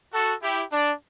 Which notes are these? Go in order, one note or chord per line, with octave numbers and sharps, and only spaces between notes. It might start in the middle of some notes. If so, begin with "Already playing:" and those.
F#4 A4
E4 G4
D4